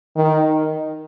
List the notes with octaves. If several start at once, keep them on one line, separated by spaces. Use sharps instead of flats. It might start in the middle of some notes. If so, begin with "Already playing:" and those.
D#3